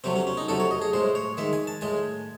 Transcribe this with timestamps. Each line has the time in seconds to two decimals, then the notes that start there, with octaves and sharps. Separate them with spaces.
0.04 C3 F#3 A3 C4
0.16 C#4
0.27 C#4
0.37 D#4
0.48 C3 F#3 A3 A4
0.60 C#5
0.71 D#5
0.82 G#4
0.93 A2 G#3 C5
1.15 C#5
1.37 D#3 G#3 E5
1.53 G#5
1.67 A5
1.81 A2 G#3 G#5